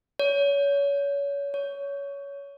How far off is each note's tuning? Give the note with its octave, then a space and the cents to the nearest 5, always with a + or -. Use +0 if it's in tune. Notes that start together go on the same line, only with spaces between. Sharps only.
C#5 +30
C#5 +20